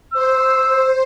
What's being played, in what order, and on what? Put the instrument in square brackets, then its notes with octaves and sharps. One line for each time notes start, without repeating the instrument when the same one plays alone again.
[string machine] C5 [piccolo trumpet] E6